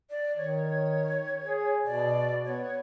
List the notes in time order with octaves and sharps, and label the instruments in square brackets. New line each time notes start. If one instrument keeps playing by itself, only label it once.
[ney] D5
[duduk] D#3 [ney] C#5
[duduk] G#4
[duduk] B2 [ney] D5
[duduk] B3 [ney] C#5